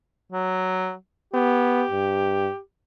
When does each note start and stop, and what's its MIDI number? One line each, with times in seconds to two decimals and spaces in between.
0.33 0.94 54
1.34 1.84 59
1.34 2.59 67
1.91 2.49 43